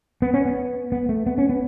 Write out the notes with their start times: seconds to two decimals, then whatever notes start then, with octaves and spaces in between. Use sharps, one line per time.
0.22 B3
0.34 C#4
0.45 B3
0.92 B3
1.09 A3
1.26 B3
1.38 C#4
1.49 B3